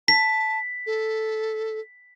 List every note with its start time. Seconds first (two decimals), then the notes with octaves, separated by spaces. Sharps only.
0.08 A5 B6
0.86 A4